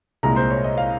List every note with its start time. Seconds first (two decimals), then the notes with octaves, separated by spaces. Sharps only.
0.23 C2 A#2 G#3 A#5
0.36 C5
0.50 C#5
0.64 D#5
0.78 F5